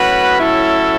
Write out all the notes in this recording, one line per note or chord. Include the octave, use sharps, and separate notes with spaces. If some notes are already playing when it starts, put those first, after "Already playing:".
Already playing: A2 F#3 C#4 F#4 B4
E4 A4